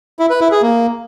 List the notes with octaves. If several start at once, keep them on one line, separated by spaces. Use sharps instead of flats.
E4
B4
E4
G#4
A#3